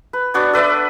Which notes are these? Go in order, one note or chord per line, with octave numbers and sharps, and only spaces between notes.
B4
B3 D4 F#4 C#5
A4 B4 D5 E5